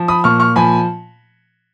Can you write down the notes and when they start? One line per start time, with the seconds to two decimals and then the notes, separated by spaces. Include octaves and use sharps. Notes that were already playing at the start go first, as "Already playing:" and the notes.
Already playing: F3
0.08 B5 D#6
0.24 A#2 C#6 F6
0.40 C#6 F6
0.56 F3 G#5 B5